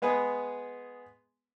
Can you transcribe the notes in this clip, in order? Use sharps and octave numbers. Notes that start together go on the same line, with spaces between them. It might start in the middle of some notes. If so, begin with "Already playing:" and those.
G#3 B3 G#4 B4